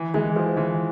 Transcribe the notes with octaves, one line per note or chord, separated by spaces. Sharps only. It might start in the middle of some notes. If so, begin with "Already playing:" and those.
Already playing: E3
E3 G#3
F3
E3